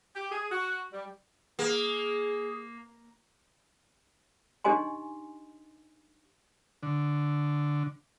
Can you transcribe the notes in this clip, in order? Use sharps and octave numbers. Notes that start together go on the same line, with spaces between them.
G4
G#4
F#4
G3
A#3 G#4
D4 D#4 G4 D#5 G#5 C6
D3